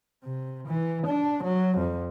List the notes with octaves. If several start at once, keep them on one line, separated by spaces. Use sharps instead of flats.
C3
E3
D4
F#3
F2